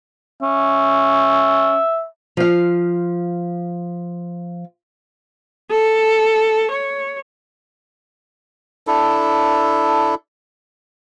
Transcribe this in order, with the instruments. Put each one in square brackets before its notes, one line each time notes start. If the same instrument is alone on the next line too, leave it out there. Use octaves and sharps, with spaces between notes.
[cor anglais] C#4 [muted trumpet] E5
[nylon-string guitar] F3 F5
[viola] A4
C#5
[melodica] D4 E4 A4